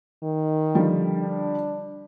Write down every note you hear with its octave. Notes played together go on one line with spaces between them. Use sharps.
D#3
D3 F3 G3
D4